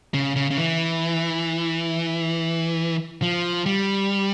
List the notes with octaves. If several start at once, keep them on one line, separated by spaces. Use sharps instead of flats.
C#3
C#3
C#3
E3
F3
G3